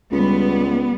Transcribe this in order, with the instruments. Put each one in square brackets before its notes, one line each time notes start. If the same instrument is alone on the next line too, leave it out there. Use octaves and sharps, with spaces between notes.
[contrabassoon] C#2 [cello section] G3 B3